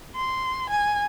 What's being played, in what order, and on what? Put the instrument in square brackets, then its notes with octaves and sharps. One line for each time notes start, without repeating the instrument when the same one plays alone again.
[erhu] C6
G#5